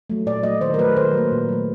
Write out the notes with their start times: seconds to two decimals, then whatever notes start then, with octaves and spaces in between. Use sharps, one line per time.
0.10 F#3 A3
0.26 A#2 D5
0.43 F#3 A3 D#5
0.61 D#3 C5
0.74 A#4
0.79 F#3 A3 B4
0.96 D#3 C5
1.13 F#3 A#3
1.31 A#2
1.49 F#3 A3